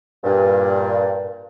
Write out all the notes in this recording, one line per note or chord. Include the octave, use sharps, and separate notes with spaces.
G2 A#2